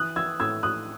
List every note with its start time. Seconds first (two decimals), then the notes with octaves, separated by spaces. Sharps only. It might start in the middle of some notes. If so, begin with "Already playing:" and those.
Already playing: E3 D#6 F#6
0.16 E3 E6 G#6
0.40 A2 E6 G#6
0.63 A2 D#6 F#6